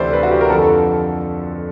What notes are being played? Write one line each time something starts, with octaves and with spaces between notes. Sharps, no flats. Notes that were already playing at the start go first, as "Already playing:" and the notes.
Already playing: D2 C3 E3 C5 D5
B4
F#4
G4
A#4
F2 D3 F3 A4